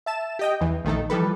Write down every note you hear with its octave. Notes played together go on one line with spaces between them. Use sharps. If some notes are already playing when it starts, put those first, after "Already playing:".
E5 A5 E7
G4 D#5 G5
E2 E3
A#1 D#3 A3 D#4 A4
E3 F3 G3 A4 B4